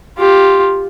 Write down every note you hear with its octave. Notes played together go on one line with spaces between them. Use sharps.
F4 G4